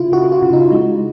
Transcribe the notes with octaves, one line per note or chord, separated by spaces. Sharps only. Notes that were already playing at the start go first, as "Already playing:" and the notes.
Already playing: C#3 E4 F4
C#3 F#4
F4
C#3
D#4
G#3